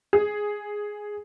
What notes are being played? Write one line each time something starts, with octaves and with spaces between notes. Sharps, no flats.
G#4